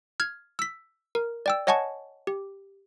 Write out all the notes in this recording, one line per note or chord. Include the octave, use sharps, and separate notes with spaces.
F6 G#6
E6 B6
A#4
D5 G5 E6
C#5 D#5 F#5 G#5 A5 C#6
G4